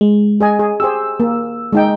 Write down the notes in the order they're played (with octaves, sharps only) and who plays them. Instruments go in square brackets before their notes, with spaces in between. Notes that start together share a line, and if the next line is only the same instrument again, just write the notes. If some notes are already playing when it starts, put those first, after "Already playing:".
[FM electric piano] G#3
[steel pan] G#4 D#5 G#5
G#4
[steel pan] G4 G#4 C5 [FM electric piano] E6
[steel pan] A#3
G#3 D#4 G5